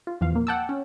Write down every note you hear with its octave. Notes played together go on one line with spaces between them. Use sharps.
F4
E2 F3 F5
A#2 A#3
F#5 G5 A5 D6 E6
C#4